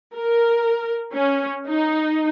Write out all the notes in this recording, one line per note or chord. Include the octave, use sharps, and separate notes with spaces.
A#4
C#4
D#4